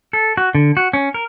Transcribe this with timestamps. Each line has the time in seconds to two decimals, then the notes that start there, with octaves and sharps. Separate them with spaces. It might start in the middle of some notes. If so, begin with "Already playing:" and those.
0.13 A4
0.37 F#4
0.55 D3
0.77 F#4
0.93 C#4
1.14 A#4